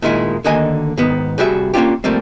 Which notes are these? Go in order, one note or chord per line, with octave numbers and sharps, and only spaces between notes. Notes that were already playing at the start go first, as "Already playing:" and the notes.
A#2 D#3 G#3 E4
D2 D3 D#3 A#3 D#5 G#5
G#2 D#3 B3
C2 G3 F#4 G#4 E5
A#3 C#4 D4 F4 G4
F3 G3 A3 A#3 C4